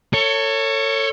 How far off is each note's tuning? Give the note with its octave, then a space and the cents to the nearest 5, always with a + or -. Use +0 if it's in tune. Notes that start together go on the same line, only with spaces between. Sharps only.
A4 +35 C#5 +0